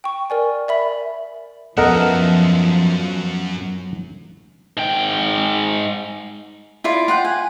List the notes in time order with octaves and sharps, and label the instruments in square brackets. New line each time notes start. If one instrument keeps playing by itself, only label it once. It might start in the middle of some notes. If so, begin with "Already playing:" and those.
[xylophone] G5 C#6
A#4 D5 G#5
D5 E5 B5
[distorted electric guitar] F#2 E5 [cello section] F3 [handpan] B3 A4 D#5 [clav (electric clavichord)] A#4 F#5
[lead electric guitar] G#2 G5
[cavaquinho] E4 F4 D5
F4 F#5 G5
G#5